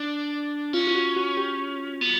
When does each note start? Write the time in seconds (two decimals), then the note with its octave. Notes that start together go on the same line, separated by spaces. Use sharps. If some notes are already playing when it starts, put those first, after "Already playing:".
Already playing: D4
0.73 C#4 F4
0.87 F4
0.95 F#4
1.16 F#4
1.37 G4
2.01 B3